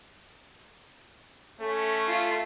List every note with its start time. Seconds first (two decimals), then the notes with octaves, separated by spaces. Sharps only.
1.60 A3 C#4 A4
2.08 F4